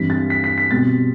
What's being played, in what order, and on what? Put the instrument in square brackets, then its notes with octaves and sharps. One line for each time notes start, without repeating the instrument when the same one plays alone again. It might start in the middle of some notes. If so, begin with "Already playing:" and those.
Already playing: [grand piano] G2 E3 G3 C4 E4 B6
A6
B6
B6
B6
B2 G3 C4 A6